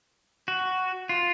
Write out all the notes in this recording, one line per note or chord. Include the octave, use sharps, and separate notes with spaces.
F#4
F4